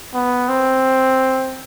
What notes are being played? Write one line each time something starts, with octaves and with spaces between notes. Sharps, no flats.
B3
C4